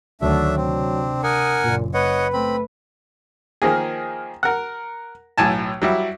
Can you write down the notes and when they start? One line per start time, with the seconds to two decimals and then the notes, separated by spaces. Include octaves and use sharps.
0.21 D2 D#3 F#3 A3 D4 E5
0.56 C3 C4 D4
1.23 A#4 F#5 G#5 D#6
1.64 F#1 A#2
1.94 B4 C#5 D#5 F#5
2.33 A3 C4 B5
3.62 D#3 F3 A#3 G#4
4.43 A#4 F#5
5.38 B1 A2 G#5 A5
5.82 F#3 G3 E4